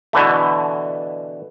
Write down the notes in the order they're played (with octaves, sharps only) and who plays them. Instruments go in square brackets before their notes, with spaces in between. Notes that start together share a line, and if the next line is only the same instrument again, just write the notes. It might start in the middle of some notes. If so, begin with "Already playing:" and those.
[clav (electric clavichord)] B2 D3 E3 A3